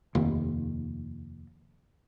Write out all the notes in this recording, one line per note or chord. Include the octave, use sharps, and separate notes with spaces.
F1 D#2